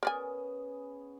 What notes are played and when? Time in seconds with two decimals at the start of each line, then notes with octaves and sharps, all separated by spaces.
0.03 B3 C#4 G#4 A#4 D5 G#5